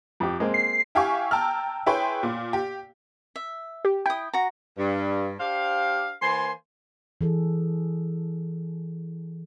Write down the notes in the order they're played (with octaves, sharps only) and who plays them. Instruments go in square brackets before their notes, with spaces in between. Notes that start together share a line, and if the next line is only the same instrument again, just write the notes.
[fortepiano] F2 G4
G#3 A#3 C4
[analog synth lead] C7
[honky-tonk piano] E4 G4 F5 G#5 C#6
G5 A5 A#5 E6 F6
E4 G#4 B4 C#5 G5 C6
A#2
G4
[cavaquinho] E5
[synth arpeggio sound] G4
[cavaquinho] E4 D#6 [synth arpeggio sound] G5
[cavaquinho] F#4 A#5
[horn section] G2
D4 G4 C5 F5
E3 A#3 C5 G#5 C6
[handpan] E3 G#4 A4